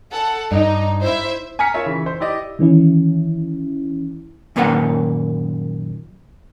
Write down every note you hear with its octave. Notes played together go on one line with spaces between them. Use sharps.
A4 F#5
G2 D#4
E4 C5 E5
G#5 A#5 F6 B6 C#7
F4 A#4 C#5 E5
C#3 E3
C5
E4 G4 D5 D#5
D#3 E3 C#4 E4
F#2 A#2 D#3 A#3 B4 F#5